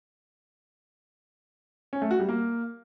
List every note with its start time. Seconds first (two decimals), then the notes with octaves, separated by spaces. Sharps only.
1.93 C#4
2.02 A3
2.11 F#4
2.20 G3
2.29 A#3